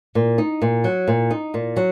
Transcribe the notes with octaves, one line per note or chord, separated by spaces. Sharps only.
A#2
D#4
A#2
F#3
A#2
D#4
A#2
F#3